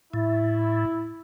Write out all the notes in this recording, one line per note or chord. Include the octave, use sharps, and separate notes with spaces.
A2 E4